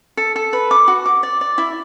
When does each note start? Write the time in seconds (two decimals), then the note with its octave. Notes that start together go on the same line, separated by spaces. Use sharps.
0.17 A4
0.36 A4
0.53 B4
0.71 D6
0.88 F#4
1.06 D6
1.23 D5
1.41 D5
1.58 E4